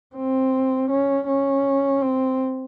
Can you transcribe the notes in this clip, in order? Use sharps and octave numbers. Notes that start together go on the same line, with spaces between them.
C4
C#4
C#4
C4